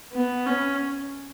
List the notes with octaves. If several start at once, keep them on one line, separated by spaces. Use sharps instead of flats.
B3
C#4